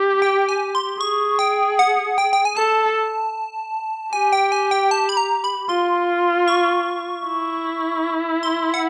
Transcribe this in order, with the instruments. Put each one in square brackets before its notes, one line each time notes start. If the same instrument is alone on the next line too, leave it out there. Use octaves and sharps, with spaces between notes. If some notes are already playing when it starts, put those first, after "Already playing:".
Already playing: [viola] G4
[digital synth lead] G5
G#5
C6
[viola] G#4 [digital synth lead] C#6
[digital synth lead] G5
F#5
G5
G5
G#5
[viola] A4 [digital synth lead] A5
[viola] G4 [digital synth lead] G#5
[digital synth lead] G5
G#5
G5
A5
B5
A#5
B5
[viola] F4 [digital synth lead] C6
[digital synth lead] C#6
[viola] E4
[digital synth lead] C6
F#5